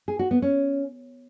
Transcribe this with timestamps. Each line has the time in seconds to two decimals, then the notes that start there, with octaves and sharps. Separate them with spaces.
0.08 G#4
0.19 F#4
0.31 B3
0.42 C#4